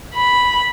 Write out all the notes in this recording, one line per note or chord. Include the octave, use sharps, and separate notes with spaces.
B5